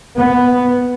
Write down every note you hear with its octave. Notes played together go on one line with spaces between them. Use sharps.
B3